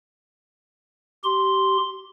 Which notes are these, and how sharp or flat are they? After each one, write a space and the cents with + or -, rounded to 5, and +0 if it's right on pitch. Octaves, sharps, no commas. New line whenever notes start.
G4 -25 C6 +0